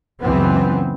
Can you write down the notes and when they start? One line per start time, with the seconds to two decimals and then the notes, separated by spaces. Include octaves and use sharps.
0.20 C#2 F#2 E3 B3 C4